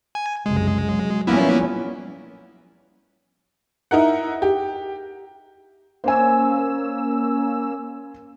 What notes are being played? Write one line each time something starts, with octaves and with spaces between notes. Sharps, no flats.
G#5
F#1 C2 G#3
F#3
F3 G3 A#3 B3 C#4 E4
D#4 E4 A#4 F#5
G4
A#3 C#4 C5 G#5 E6